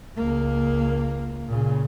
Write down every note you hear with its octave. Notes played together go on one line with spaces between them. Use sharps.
C#2 A#3
A#2 C#3